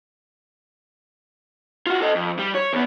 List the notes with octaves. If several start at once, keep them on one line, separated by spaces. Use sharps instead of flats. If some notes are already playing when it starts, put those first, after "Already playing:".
F4 F#4
A4 D#5
F2
G3
C#5
E2 B3